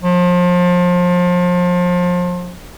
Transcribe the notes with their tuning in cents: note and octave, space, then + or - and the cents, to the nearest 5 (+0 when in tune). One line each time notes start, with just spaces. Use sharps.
F3 +30